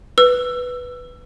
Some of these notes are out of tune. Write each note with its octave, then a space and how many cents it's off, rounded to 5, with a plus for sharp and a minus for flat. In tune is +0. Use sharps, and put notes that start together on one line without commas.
B4 +0 E6 +20